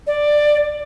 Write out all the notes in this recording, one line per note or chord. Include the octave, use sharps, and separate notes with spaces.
D5